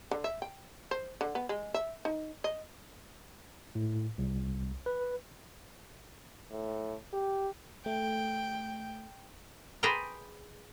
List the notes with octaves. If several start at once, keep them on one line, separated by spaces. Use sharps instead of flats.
D3
E5
G5
C5
D3
B3
G#3
E5
D#4
D#5
A2
C2
B4
A2
G4
A3 G5
G#4 B4 C5 D5 G5 A#5